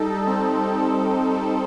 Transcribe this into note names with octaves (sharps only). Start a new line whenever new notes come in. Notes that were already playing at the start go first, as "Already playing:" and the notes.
Already playing: G3 D#4 A4
C4
G3